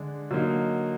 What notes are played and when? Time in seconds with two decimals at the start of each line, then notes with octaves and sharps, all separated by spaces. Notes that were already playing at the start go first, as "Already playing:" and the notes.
Already playing: D3 G#3 D4
0.31 D3 F#3 A#3 D#4